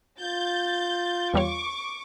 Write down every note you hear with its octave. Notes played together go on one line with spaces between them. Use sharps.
F4 G6 A6
E2 G3 C#5 C#6 D6